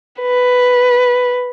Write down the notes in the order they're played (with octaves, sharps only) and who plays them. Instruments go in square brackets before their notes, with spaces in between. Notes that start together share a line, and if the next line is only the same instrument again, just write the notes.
[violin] B4